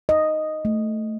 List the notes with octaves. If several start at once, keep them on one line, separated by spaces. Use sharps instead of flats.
D#5
A3